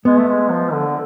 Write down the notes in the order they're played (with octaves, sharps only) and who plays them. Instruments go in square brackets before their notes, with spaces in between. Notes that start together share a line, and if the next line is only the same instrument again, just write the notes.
[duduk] G#3 [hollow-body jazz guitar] B3
[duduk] A3
G#3
F3
D3